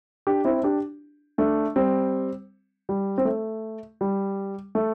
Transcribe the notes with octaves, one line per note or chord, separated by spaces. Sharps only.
D4 G4
C4 E4
D4 G4
A3 D4
G3 C4
G3
C4
A3
G3
A3